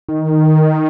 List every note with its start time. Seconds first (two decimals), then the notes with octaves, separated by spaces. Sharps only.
0.09 D#3